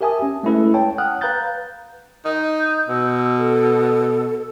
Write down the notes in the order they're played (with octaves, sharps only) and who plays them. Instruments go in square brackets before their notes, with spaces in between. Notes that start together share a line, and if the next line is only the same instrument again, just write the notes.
[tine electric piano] G4 A#4 E5 G#5 A5 D#6
C#4
G#3 A3 C#4 E4 A4 B4
C#5 G5 A5
F#5 G5 D#6 F6 F#6
B4 F5 A#5 F#6 G6 A6
[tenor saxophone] D#4 [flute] G6
[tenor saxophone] B2 [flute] E6
[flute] A4